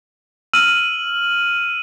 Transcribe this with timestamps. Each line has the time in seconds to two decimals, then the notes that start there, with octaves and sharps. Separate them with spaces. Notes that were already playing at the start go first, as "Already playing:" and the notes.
0.53 E6 F6 D#7 F#7